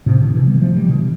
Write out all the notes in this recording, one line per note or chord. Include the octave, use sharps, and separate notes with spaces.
A2 C3
B2 D3
C3 E3
G3 B3
F3 A3
E3 G3
B2 D3